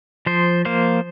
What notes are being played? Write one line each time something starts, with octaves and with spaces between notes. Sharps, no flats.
F3 C5
A#3 C5